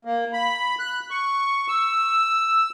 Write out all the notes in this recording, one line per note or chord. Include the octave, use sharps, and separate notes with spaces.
A#3
B5
F#6
C#6
E6